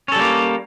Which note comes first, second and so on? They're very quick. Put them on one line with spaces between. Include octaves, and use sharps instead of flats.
C#4 A4 G3 A#3